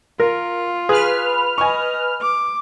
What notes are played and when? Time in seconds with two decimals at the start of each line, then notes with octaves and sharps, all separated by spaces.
0.20 F4 A#4
0.89 G#4 B4 F6
1.58 D#5 G#5 C#6
2.21 D6